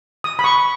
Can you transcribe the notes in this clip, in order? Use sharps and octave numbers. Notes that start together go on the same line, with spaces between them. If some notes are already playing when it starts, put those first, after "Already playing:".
D#6
B5
C#6